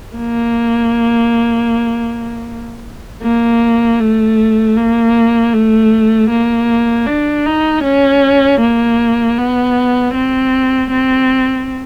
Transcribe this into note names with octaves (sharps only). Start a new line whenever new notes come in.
A#3
A#3
A3
A#3
A3
A#3
D4
D#4
C#4
A#3
B3
C4
C4